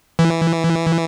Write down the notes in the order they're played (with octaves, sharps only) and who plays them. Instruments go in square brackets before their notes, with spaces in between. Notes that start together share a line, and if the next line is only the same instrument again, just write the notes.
[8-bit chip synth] E3